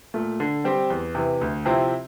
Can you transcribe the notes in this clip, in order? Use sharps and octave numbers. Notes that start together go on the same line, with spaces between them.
A#2 A3
D3
G3 C4 G4
E2
C3 E3
D2
C3 F3 C4 E4